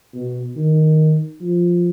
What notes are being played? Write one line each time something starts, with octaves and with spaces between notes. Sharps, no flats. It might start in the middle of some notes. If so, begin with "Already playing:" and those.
B2
D#3
F3